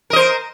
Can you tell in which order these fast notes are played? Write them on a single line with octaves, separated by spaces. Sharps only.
A#4 D#5 C5